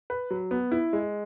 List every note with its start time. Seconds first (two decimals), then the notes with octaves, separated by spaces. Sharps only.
0.10 B4
0.30 F#3
0.51 B3
0.71 E4
0.93 G#3